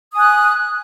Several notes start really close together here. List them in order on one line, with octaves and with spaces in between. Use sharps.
D#6 G#5 F#6